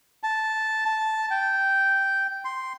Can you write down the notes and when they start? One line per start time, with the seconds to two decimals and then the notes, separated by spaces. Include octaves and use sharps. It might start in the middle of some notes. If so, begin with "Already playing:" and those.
0.23 A5
0.85 A5
1.31 G5
2.45 C6